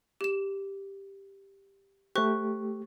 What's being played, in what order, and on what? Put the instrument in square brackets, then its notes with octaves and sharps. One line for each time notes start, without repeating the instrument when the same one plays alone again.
[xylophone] G4 E7
[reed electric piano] A3 G4 [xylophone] C5 C#6 F#6